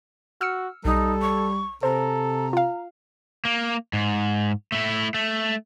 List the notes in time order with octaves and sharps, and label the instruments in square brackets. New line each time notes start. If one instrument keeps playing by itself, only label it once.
[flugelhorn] F#4 [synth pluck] E6 F6 C#7
[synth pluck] B1 [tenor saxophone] G3 [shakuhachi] D#4 [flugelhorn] A4
[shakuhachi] C#6
[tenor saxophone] C3 [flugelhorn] A4 [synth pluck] C5 [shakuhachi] A#5
[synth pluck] F4 F5
[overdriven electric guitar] A#3
G#2
A3 E4
A3